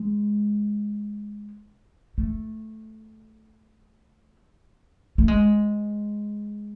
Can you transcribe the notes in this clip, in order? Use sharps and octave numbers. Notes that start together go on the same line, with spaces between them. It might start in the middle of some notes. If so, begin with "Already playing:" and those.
Already playing: G#3
A3
A3
G#3